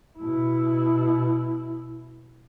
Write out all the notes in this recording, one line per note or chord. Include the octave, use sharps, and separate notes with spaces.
B2 E4